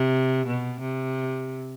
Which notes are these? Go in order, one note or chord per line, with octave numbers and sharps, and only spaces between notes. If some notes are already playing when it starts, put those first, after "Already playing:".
Already playing: C3
B2
C3